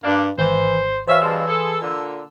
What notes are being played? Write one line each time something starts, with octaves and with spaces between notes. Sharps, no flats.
G2 G3 A#3 D4
G#1 E3 C5
B2 E3 C5 C#5 E5 F5
G2 B2 G#3 A5 C6 E6
G#4 A4
A#2 D3